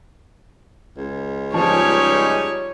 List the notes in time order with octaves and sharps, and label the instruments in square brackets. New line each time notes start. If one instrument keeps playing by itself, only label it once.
[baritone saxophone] C#2
[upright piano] F3 [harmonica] G3 D#4 G#4 [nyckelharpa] C#5